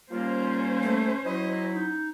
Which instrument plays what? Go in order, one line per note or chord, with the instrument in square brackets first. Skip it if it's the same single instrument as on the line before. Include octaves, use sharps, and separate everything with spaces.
[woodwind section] D#2 G3 A#3 [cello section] C#4 C5 [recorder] F4
[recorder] A3
[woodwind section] F#3 E4 [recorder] D#5
[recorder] D#4